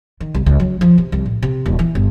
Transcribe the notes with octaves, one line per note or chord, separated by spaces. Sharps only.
D#3
C2
C#2
F#3
F3
C3
C2
A2
C3
D#1
E3
G1